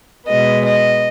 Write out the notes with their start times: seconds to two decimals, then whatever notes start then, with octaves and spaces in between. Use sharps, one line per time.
0.29 B2 G#3 B3 D#5
0.65 D#5